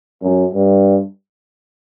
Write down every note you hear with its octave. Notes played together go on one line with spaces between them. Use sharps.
F#2
G2